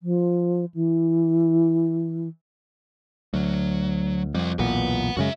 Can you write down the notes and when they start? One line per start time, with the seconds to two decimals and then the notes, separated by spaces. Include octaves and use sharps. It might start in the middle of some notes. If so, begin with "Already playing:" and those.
0.03 F3
0.74 E3
3.34 D2 F#3
4.35 F2 G3 C4
4.59 B1 E2 A#2 B4 F#5
5.17 F#2 C#3 G#3 F#4 E5